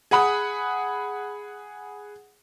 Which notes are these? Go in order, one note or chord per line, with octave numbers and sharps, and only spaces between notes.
G#4 F#5 B5 D#6